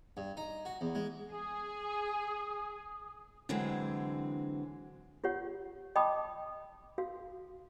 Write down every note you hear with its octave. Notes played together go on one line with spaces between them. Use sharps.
G2
D#4
F#4
E2
G#3
G#4 D#6
D3 E3 F#3 G#3 C4
F4 G4 C#5 F#5
D#5 G5 A5 B5 D6 D#6
F#4 F5